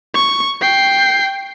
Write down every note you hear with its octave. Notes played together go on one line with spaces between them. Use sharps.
C#6
G5 C7